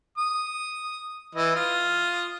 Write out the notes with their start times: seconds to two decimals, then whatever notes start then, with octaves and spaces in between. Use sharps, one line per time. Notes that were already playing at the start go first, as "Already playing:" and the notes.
0.18 D#6
1.35 E3 D#5
1.56 F4 D#6